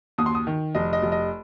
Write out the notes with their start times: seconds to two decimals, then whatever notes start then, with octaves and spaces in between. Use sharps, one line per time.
0.18 D#2 D#6
0.26 C6
0.35 D#6
0.47 D#3
0.75 F1 D#5
0.93 D#5
1.02 F1
1.12 D#5